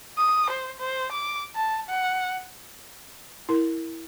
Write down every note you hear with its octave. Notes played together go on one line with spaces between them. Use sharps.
D#6
C5
C5
D6
A5
F#5
E4 A#4